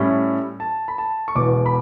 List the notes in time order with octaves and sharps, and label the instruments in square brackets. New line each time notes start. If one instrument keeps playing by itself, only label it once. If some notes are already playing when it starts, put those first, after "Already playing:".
Already playing: [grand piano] A2 G3 C#4 E4
A5
B5
A5
C#6
E1 E2 B2 D6
B5